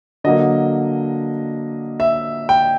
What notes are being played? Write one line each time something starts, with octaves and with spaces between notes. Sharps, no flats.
D3 F#3 A#3 D#5
E5
G5